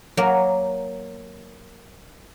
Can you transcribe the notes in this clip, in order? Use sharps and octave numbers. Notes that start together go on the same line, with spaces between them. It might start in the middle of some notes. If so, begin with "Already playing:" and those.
F#3 A#3 A#4